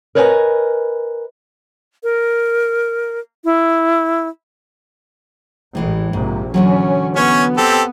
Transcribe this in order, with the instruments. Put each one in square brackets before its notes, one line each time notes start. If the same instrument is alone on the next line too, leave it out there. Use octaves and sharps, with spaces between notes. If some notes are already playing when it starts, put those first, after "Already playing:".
[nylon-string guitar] A#4 B4 C#5 D#5 E5 G#5
[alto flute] A#4
E4
[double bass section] A1 [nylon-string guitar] A2 E3 G#3
[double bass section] A#1 C3 [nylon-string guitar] G#2
[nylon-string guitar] D3 E3 F#3 [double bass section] C#4
[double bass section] B3 [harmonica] C#4 C#5
[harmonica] C4 G4 A4